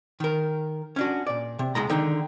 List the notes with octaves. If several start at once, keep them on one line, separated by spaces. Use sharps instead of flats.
D#3 A#4
C#4 D4 F#4
A#2 D5
C3
C#2 B2 G#3 A#5
D3 D#3 D#4